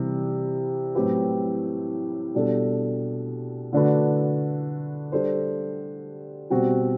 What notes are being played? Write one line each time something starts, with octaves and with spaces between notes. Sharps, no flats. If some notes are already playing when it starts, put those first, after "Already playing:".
Already playing: C3 E3 G3
A2 F#3 C4 G4 B4
B2 G3 D4 A4
D3 A3 D4 F#4 B4
G3 D4 A4 C5
B2 G3 C4 F#4